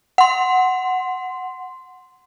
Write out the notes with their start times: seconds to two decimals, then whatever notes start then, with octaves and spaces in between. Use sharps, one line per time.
0.18 F#5 C6